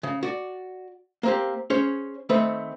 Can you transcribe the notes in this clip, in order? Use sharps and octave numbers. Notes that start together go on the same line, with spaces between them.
C#3
F#4 D5
A#3 C4 G4
C#4 G#4 C5 C#5
D#3 A3 C4 B4